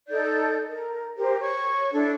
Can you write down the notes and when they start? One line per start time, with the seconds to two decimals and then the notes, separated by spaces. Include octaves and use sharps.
0.09 D#4 A4 D5 G6
0.68 A#4
1.17 G4 A#4 C5
1.41 C#5 C#6
1.92 D4 E4 A4